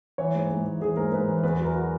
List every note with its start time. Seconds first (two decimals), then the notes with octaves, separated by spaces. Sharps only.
0.18 E3 C#5
0.35 G#2
0.50 G#2
0.65 E3
0.81 E3 G#4
0.97 G#2 A#4
1.12 G#2 B4
1.28 E3
1.43 E2 B4
1.54 B4
1.60 F#3 A#4
1.75 F#4